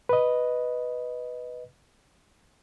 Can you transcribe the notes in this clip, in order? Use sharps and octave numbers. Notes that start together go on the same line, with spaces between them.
B4 D#5